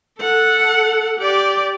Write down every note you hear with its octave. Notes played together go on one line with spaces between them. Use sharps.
A4 F#5
G4 D5